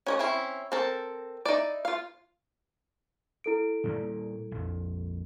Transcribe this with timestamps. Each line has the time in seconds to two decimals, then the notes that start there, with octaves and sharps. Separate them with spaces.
0.07 C#4 C#5 D#5
0.19 C4 C#4 E4
0.72 C4 A4 A#4
1.46 D#4 E4 D5
1.85 F4 F5
3.44 E4 A4 D7
3.84 A#2 G3 A#3
4.51 A#1 F2